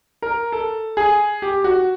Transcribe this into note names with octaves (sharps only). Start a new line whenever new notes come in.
A#4
A4
G#4
G4
F#4